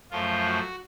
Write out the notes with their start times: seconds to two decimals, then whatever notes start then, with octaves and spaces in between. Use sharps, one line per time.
0.11 F#2 F3 A3 F4
0.46 F#4